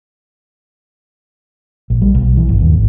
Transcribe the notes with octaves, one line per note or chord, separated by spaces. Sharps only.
A#1
G3
B1
E3
G1
D#2
G#1